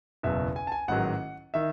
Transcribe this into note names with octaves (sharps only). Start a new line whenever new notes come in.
F#1 E2 B2 F#3 E5
G#5
A5
G#5
A1 G#2 D#3 F#3 F#5
D#3 E5